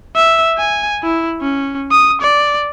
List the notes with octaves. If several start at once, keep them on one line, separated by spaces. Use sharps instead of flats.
E5
G#5
E4
C#4
D#6
D5